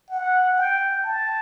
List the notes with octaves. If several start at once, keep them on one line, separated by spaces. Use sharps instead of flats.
F#5
G5
A5